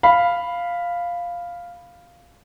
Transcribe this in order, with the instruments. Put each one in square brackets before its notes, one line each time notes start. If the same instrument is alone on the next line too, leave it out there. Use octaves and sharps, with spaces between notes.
[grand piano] F5 B5